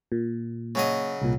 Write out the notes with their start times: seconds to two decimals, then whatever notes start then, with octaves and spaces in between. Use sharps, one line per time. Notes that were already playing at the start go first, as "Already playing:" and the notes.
0.12 A#2
0.75 C#3 F#3 D#5
1.22 C2 A#2